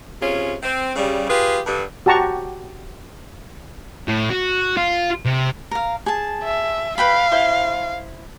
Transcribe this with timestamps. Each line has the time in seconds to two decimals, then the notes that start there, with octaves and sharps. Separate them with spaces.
0.21 C3 C#4 F4 G#4
0.63 C4
0.96 C#3 G3
1.29 F4 G4 G#4 B4
1.66 G2 D3
2.06 F#4 G4 A5 A#5 C#6
4.08 A2
4.30 F#4
4.77 F4
5.26 C3
5.71 A#4 F5
6.06 G#4 A5
6.43 E5
6.98 B4 F5 G5 B5
7.31 E4 C5 C6